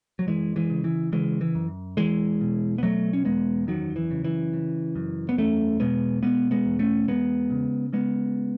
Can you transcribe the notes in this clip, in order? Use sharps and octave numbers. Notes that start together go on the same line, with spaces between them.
F#3
F#2 E3 G#3
E3 G#3
C#3
E3
C#3 E3 G#3
E3
F#2
E2 E3 G#3
B2
B3
B2 F#3 A3
C#4
E2 G#3 B3
F#2 D#3 F#3
E3
C#3
E3
C#3
F#2
B3
E2 A3 C#4
B2 G#3 B3
B2 G#3 B3
G#3 B3
E2
A3 C#4
E2 G#3 B3
C#3
C#3 G#3 B3